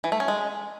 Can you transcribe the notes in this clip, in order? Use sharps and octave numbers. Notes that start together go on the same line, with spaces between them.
E3
A3
C#4
G#3